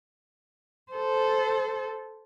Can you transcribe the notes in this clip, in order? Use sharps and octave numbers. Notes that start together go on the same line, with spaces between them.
A4 C5